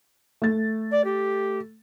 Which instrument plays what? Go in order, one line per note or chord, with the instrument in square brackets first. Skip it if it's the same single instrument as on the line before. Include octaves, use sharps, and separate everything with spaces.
[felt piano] A3 A6
[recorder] D5
G4